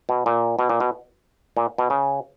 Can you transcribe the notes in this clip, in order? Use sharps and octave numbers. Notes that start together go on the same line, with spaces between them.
B2
A#2
B2
A#2
B2
A#2
B2
C#3